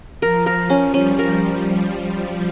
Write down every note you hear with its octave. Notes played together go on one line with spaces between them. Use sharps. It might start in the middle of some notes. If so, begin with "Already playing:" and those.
F3 A#4
A#4
F3
C#4
G3 C#4
A#4